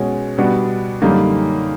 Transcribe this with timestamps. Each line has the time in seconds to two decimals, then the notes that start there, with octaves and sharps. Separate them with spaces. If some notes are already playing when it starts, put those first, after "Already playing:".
Already playing: B2 G#3 C#4
0.38 B2 G3 B3 D4 F#4
1.02 F#2 D3 G3 A#3 D#4